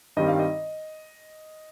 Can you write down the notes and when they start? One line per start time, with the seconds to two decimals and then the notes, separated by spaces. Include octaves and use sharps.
0.16 G2 D#3 G3 C4 D#5
0.28 F5
0.39 D#5